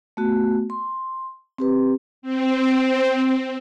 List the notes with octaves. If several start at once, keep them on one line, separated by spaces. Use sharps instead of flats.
A3 B3 F#4
C6
C4 G4 B4
C4